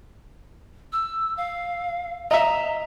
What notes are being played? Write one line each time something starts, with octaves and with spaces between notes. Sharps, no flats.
E6
F5
D#5 E5 A#5